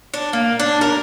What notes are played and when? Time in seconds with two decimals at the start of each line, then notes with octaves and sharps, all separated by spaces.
0.14 D4
0.33 A#3
0.60 D4
0.81 A#4